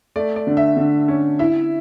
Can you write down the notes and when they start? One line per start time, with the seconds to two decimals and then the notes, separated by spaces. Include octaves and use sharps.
0.16 A3 D5
0.36 D5
0.47 D3
0.57 E5
0.77 D3
1.08 C#4
1.39 E4 E5